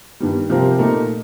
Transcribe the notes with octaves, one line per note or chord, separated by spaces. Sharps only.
G2 D#3 G3
C3 F3 C4 G4 A#4
A#2 A3 D#4 A#4